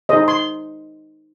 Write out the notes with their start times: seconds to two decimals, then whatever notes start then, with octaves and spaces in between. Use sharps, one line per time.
0.09 D#4 G#4 C5 D#5
0.28 C6